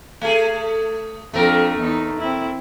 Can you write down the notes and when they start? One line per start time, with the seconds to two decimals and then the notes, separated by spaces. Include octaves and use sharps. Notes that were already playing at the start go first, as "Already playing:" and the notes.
0.21 A3 G#4
1.34 F2 A3 D4 A#4
1.79 E2 D#4
2.19 C4 E4